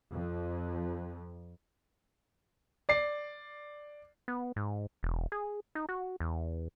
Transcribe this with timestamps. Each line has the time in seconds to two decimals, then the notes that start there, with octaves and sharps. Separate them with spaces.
0.13 F2
2.89 D5 C7
4.28 B3
4.56 G#2
5.03 E1
5.32 G#4
5.75 D#4
5.89 F#4
6.20 E2